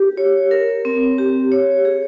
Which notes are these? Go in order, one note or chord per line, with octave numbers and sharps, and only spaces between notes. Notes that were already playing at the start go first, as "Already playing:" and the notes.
Already playing: G4
C#5
A#4
C4
G4
C#5
G#4